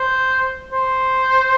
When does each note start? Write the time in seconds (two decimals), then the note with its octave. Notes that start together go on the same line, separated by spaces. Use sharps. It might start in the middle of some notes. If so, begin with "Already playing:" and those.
Already playing: C5
0.72 C5